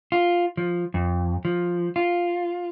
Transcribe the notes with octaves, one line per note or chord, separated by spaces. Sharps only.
F4
F3
F2
F3
F4